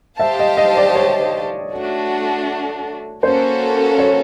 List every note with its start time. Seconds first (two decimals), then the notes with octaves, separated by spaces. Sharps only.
0.20 G4 C5 E5 F5 A5
0.39 D#5
0.57 D#5
0.77 D5
0.95 C#5
1.72 A3 D4 F#4
3.23 A#3 C#4 F#4 A4 C5
3.98 C#5